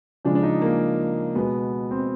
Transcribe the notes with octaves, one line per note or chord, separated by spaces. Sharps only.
C#3 F3 G#3 D4
D4
D#4
A#3
B2 G#3 B3
C4